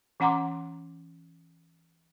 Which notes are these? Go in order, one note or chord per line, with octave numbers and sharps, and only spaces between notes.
E3 C#4 F#5 A#5 C6 D6